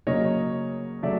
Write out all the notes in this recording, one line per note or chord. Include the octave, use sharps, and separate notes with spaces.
C#3 F#3 A#3 C#5 D#5
C#3 F#3 A3 D5 E5